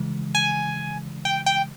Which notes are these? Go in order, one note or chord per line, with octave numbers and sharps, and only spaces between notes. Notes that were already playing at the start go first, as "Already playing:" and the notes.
Already playing: C#3 E3 G#3
G#5
G5
G5